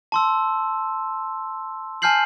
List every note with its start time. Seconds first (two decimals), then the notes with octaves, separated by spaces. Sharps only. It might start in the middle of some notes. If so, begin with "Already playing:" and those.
0.12 A5 C6 E6
2.02 G#5 A5 F6 G6 C7 F#7